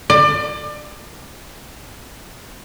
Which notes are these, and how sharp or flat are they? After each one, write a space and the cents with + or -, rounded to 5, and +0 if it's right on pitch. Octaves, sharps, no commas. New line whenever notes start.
D5 +30